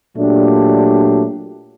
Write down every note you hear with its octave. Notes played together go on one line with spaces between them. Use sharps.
A#2 F#3 A3 D4 G4